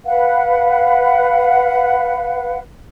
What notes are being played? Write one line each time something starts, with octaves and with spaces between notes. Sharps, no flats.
B4 F5 F#5